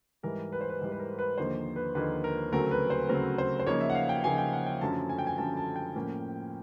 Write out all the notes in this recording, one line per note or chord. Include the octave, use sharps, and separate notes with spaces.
G#2 E3 G3 A#4
B4
C5
B4
G#2 E3 G3
B4
A#4
B4
D#2 D3 F3 A#3 D#4 C5
B4
D#2 D3 F3 A#3 D#4 B4
A#4
D2 C#3 F#3 A3 C4 A#4
B4
C5
D2 C#3 F#3 A3 C4 A#4
C5
C5
C#3 F3 A#3 D#4 C#5
E5
F#5
F5
G5
C#3 F3 A#3 D#4 G#5
G5
F#5
G5
F#2 D3 F3 A3 C#4 A5
G#5
G5
G#5
F#2 D3 F3 A3 C#4 A5
A5
G5
A2 F3 A#3 C#4